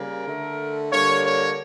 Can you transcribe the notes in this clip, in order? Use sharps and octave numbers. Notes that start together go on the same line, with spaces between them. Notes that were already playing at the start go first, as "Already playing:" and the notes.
Already playing: C#3 G3 A#3 A#4
D3 A3
D3 G3 A#3 C#5
C#5